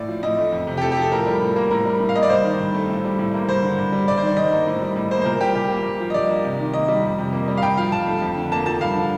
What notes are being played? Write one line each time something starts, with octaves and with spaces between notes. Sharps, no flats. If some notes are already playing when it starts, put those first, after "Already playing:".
Already playing: A2 D5
F3
A2 D#5
A3
F2
C3
G4
F2 A4
G4
F3 A4
A2 A#4
G3
A2
A#3
A2 A#4
G3
A2
F5
A#3 D#5
D5
G2 C5
D#3
G2
A3
A2
G3
A2
A#3
G2 C5
D3
G2
G3
G2 D5
C5
D#3 D5
G2 D#5
A#3
A2
G3
A2
A#3 C5
C5
A#2 A#4
G3 G4
A#2 G4
A#3
G2
F3
D#5
G2 D5
A#3
C3
D#3
A#3 D#5
G3
F2
C3
A#3
G3
F5
G2 G5
F3 F5
G2 A5
A3
F2
D3
A#3 A5
F3 A5
G2 F5
D3